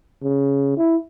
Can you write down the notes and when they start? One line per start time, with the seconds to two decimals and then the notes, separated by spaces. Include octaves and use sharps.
0.23 C#3
0.77 E4